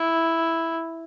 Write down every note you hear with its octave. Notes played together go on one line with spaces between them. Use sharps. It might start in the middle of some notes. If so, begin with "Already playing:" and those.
Already playing: E4